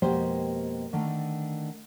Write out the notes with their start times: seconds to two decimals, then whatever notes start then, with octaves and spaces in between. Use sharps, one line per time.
0.02 F2 B2 G#3 A#3 G4 C5
0.93 D3 D#3 A3